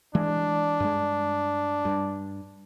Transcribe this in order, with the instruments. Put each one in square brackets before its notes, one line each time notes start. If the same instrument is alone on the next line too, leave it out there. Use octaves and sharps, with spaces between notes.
[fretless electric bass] E3 G#3 [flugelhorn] D4
[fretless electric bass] G2 G#3
G2